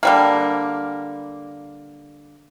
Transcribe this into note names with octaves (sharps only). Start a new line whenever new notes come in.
D3 G3 A#3